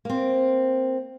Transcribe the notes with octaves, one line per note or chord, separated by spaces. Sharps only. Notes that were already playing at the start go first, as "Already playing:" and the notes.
A#3 C4